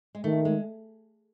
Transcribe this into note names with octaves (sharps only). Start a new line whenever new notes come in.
G#3
D#3 A3
G#3